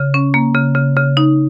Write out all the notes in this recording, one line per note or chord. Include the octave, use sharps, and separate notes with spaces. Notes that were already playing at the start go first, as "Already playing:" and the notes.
Already playing: C#3
C#4
A#3
C#3
C#3
C#3
D#4